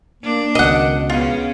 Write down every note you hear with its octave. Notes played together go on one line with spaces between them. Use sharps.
A#3 D4
C#2 B2 D#3 D#5 F#5
C#3 B3 C#4 F4